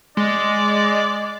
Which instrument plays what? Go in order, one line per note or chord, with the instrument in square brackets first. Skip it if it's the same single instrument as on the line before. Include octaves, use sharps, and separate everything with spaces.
[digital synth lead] G#3 [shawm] D5